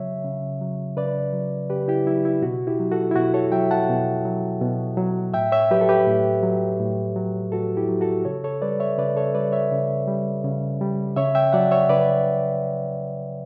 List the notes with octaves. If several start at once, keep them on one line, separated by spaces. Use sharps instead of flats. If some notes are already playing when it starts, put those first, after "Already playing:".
Already playing: C#3 F#3 C#5 E5
C#3
F#3
C#3 B4 D5
F#3
C#3 G4 B4
E4 G4
F#3 E4
E4
B2 F#4
E4 G4
F#3
F#4 A4
E4
B2 F#4
A4 C#5
F#3 E5 G5
F#5 A5
B2
F#3
B2
F#3
A2 E5 G5
C#5 E5
F#3 G4 B4
A4
G4 B4
A2
F#3
A2
F#3
A2 F#4 A4
E4 G4
F#3
F#4 A4
C#3 A4 C#5
A4 C#5
G3 B4 D5
C#5 E5
C#3 B4 D5
A4 C#5
G3 B4 D5
C#5 E5
C#3
G3
C#3
G3
C#3 C#5 E5
E5 G5
F#3 D5 F#5
C#5 E5
C#3 B4 D5